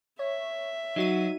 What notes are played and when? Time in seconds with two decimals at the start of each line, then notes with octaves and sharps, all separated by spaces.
0.19 C#5 E5
0.96 F#3 D#4 F#4 D#7